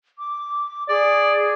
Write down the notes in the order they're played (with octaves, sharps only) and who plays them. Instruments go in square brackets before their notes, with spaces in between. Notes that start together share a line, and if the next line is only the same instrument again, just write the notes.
[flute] D6
[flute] G#4 [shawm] D5